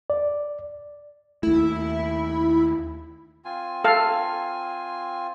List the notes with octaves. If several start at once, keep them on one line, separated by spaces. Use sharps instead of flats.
D5
D#2 A3 E4
C4 F4 G#5
A4 F5